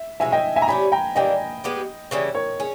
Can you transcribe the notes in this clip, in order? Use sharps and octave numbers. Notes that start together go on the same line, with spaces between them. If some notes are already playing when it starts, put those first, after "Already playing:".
Already playing: E5
B2 G#3 C#4 E5 G#5
D#5 G5
E5 G#5
A#5
G3 C#4 G4 G#5 B5
G5 A#5
E3 G3 A#3 D#5 G5
G#3 B3 G4
C#3 E3 G3 C#4
A#4 C#5
C#4 G#4